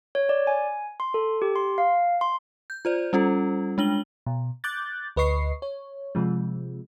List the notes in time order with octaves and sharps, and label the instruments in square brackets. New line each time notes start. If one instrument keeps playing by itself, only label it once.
[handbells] C#5
D5
G#5
C6
A4
G4
C6
F5
C6
[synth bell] G6
F4 C5 D5
G3 C#4 F4 A4
G#3 D4 F#7 G7
[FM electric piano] B2
D6 F#6 G6 A6
D2 B4 D#5 C#6 C7
C#5
C3 F3 G#3